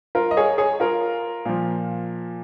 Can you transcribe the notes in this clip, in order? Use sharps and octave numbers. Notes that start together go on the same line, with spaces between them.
F4 A#4
D#5
G#4 C#5
G#4 C#5
F4 A#4
A#2 F3